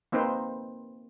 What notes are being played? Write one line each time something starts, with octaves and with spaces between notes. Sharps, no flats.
A#3 C4 D#4 B4 C5